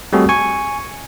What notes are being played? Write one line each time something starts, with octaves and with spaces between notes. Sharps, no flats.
G3 A3 C4 F#4 G#4 A4
G#5 C#6